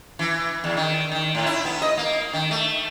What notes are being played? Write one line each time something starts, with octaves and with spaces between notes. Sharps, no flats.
E3
E2
D#3
D#3
A2
E4
B3
D#5
A#3
D#3
A3